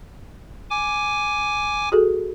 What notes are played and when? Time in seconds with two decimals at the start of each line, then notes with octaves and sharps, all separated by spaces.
0.70 G#5 D6
1.92 F#4 G#4 A4